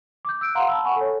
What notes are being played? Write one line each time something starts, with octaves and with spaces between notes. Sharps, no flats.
D6 G6
E6 F#6 D7
F5 F#5 A#5 C6
A5 B5 E6
F#5 G#5 B5 C#6
A4 C#5